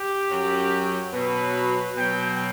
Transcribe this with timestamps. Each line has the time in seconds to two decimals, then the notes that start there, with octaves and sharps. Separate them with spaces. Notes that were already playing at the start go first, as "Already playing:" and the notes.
Already playing: G4
0.30 F#2 F#3
1.13 B2 F#3 B4
1.96 B2 F#3 G5